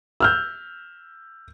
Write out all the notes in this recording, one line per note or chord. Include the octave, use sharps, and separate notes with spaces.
E6 F6 G6